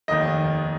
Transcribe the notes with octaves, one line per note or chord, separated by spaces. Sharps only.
F1 D#2 D#3 D#5